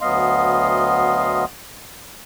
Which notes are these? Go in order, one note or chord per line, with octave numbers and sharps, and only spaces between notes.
D2 F#3 B3 D#5 F5 C6